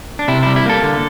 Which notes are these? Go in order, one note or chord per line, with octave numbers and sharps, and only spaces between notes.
D4
C3 E4
G3 E4
E4
A#3 A4
D3